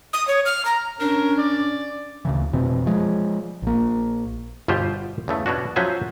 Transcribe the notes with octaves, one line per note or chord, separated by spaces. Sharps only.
D#6
C#5
F6
A#5
C#4 D4 A#4
D5
D2 C#3 E3
F1 B2 E3 C4
F3 G#3
A#1 A#3
G1 B2 F4 G4 C5
E2 C#3 A3
B2 C#4 D4 F#4
F3 F#3 C#4 C5 E5 G#5